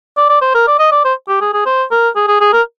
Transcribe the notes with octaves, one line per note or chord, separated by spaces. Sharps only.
D5
D5
C5
A#4
D5
D#5
D5
C5
G4
G#4
G#4
C5
A#4
G#4
G#4
G#4
A#4